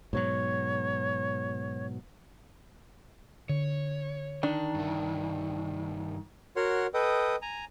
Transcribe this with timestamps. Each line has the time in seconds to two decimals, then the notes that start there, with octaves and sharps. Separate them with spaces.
0.13 G#2 B2 F#3 C#5
3.49 D3 C#5
4.43 D#3 D4 D5
4.74 G2 E4
6.56 F#4 A#4 C#5 F#5 C6
6.94 A4 B4 D#5 G5 D#6
7.42 G#5 A#5